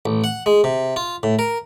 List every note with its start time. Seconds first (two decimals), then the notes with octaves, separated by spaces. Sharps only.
0.06 A1
0.24 F#5
0.46 G#3
0.64 C3
0.96 F4
1.23 A2
1.39 A#4